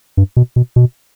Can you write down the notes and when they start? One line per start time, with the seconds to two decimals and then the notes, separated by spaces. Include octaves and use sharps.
0.17 G2
0.37 B2
0.56 B2
0.76 B2